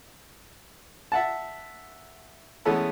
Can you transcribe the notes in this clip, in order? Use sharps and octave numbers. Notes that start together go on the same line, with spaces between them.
E5 F#5 A5
E3 G#3 A3 B3 C#4 A4